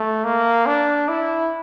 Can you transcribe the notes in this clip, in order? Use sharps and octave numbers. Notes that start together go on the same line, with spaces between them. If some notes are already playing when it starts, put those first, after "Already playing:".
Already playing: A3
A#3
D4
E4